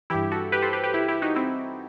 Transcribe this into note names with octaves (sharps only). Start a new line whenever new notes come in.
G2 E3 E4 G4
F#4 A4
G4 B4
A4 C5
G4 B4
G4 B4
E4 G4
E4 G4
D#4 F#4
C4 E4